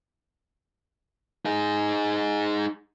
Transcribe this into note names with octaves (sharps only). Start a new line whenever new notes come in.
D#4 G#4